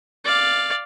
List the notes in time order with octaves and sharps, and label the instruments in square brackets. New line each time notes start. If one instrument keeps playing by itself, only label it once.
[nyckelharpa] D5 F5